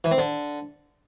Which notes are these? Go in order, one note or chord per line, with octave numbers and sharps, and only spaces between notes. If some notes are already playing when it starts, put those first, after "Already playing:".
E3
C4
D3